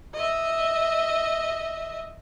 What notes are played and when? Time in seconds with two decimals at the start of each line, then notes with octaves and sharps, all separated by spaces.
0.14 D#5 E5